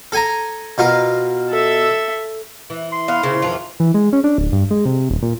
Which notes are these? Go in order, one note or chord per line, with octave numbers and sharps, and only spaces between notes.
A4 G#5 A#5
B2 F4 A#4
A4 E5
E3
C6
B3 F5
A#2 C#3 C4 E4
F2 D#3 E3 F4
E3
G#3
C#4
D4
D1
G2
G#3
C3
D#1
A#2